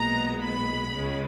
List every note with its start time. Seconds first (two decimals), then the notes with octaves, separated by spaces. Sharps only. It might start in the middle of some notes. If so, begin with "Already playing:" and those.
Already playing: B1 A#2 G#3 B3 A#5
0.43 B5
0.94 C#2 C#3 G#3